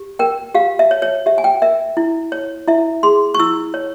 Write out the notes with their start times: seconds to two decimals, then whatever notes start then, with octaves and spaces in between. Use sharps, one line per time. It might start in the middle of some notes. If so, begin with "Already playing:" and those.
Already playing: G4
0.19 A#4 G5
0.54 G4 F5
0.79 E5
0.91 C#5
1.02 C#5
1.26 G4 E5
1.38 G#5
1.44 G5
1.62 A#4 E5
1.97 E4
2.32 C#5
2.68 E4 E5
3.03 G#4 C6
3.34 C#6
3.39 E4 E6
3.74 C#5